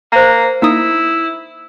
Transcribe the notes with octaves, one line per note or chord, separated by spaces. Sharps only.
A#3 C5 A#5
A#3 D#4 E4 D#6